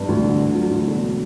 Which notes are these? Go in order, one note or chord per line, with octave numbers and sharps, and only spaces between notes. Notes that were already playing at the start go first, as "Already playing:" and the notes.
Already playing: G2
D2
D3
D3
F#3
D2
E1